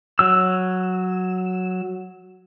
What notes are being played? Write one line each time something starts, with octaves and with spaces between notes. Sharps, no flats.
F#3 E6